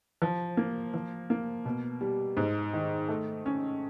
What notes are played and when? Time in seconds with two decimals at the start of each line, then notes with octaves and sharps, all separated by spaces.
0.22 F3
0.57 A#3
0.94 F3
1.30 A#3
1.65 B2
2.01 G3
2.37 G#2
2.74 D#3
3.09 A3
3.46 C#4